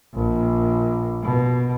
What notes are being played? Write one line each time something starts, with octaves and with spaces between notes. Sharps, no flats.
A#1
B2